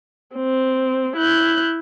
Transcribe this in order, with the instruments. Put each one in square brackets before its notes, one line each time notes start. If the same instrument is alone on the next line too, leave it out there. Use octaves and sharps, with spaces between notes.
[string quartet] C4
E4 F#6 G6